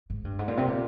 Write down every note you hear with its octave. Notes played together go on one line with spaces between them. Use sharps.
G#2
G2
G#2
A#2
C3
A#2